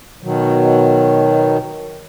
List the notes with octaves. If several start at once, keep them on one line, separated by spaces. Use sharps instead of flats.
B2 D#3 F#3